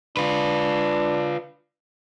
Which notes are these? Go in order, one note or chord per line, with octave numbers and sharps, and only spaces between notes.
D4 F4 B4